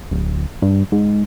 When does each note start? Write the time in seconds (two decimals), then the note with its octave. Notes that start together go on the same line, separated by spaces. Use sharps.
0.11 D1
0.62 G2
0.92 G#2